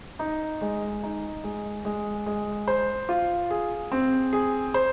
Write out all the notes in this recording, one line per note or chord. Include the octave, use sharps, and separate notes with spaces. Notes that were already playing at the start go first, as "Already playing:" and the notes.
D#4
G#3
D#4
G#3
G#3
G#3
C5
F4
G#4
C4
G#4
C5